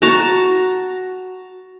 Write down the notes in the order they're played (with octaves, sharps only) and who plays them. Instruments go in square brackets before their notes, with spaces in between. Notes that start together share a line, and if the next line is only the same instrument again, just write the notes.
[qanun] F#4 A5 A#5